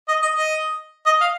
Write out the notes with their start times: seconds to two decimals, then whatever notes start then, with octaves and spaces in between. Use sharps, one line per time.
0.08 D#5
0.22 D#5
0.35 D#5
1.06 D#5
1.21 F5